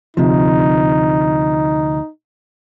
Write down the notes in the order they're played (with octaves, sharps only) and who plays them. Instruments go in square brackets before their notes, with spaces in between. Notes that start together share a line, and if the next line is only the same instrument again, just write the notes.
[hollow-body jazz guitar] D2 C3 F3 [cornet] D#4